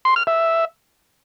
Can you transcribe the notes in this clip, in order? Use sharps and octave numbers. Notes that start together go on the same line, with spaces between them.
C6
F6
E5